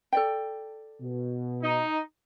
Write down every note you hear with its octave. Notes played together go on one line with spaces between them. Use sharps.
A4 D5 G5
B2
D#4